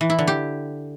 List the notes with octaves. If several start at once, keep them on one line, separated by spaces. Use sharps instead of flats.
E3
E4
D3
G4